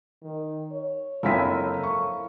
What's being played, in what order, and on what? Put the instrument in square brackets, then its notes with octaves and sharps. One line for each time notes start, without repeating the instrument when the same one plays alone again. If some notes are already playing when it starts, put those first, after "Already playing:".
[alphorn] D#3
C#5
[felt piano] F#1 C4 B6 [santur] F3 E4 G#5 [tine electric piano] A4 A#4
[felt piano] C#6